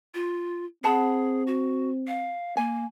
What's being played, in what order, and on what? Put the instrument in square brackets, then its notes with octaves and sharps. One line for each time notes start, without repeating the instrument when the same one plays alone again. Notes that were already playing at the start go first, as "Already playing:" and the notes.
[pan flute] F4
[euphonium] C4 [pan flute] G#4 [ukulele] F#5 A5 B5
[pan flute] F#4
F5
[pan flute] A#3 [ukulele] G#5